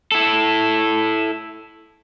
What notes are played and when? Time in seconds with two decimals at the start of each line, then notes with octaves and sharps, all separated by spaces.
0.12 E4 A4